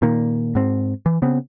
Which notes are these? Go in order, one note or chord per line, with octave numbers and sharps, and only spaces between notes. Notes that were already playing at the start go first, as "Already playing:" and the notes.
A#2 D#3 A#3
G#2 C4
E3
C#3 B3 C4